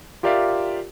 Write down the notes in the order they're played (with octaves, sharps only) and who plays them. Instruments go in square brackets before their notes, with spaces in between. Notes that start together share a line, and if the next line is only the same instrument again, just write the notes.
[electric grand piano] F4 G4 A#4 D5 E5 F5